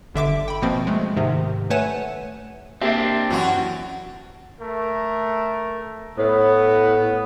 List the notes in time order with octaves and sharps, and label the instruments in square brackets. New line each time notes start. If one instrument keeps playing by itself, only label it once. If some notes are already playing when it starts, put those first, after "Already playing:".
[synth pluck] G1 D3 E5 D6 D7
G5 B5
B2 F3 A#3 C4
G#3 A3
G#2 C3 D#3
A3 B4 C#5 F#5 G#5 E7
[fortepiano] A#3 G4 E5 [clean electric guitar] C4 D4
[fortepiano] F#2 [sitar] E3 F#4
[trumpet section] A3 A#4
[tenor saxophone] A2 [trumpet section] B3